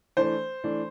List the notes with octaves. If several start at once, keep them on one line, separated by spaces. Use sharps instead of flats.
E3 A3 D4 C5
E3 A3 D4